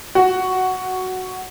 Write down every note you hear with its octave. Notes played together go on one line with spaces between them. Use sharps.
F#4